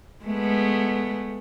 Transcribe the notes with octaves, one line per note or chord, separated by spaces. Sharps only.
G#3 A3 B3